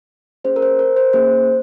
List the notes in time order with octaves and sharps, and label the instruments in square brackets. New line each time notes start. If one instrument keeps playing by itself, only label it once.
[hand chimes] A#3 C#4 G#4 C5
A#4
C5
A#4
C5
A#3 C#4 G#4 C5